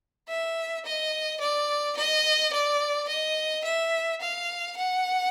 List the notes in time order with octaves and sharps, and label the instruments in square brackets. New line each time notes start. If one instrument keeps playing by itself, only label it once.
[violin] E5
D#5
D5
D#5
D5
D#5
E5
F5
F#5